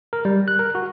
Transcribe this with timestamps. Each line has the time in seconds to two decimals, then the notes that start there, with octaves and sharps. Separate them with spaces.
0.13 A#4
0.25 G3
0.48 F#6
0.59 A#4
0.75 F#4